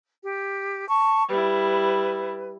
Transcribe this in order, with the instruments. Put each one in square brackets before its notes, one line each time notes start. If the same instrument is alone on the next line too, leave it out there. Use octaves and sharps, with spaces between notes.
[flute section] G4
A5 C#6
[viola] G3 E4 [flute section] B4